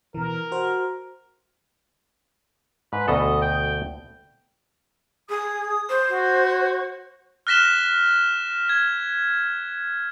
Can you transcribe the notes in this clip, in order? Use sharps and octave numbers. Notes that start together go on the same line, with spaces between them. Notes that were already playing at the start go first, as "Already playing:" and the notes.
B2 E3 A#4
F#4 C5
G#2 B4
D2 B2 A4 D#5
G5
G#4 D#6
C5
F#4
F6 F#6 A#6 B6 E7 G7
G#6